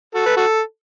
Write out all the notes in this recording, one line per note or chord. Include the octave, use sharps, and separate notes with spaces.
F#4 A4
B4
F#4 A4